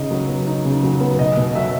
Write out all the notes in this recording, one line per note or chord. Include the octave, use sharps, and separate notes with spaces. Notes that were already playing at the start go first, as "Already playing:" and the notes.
Already playing: C#3 D#4 D#5
F#3
B3
D#4
C#3
F#3
B3
B2 D#5
B2
F#3 E5